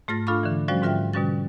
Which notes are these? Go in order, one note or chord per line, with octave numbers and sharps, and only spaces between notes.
G#2 A3 F4 F6 A6 A#6
D4 F4 A4 F5 B5 C#6
D3 E3
F3 G3 C#4 F#4 C5 D5
G#2 D3 F4 A#4 E5 G5
B2 D3 G3 C#4 F#4 A6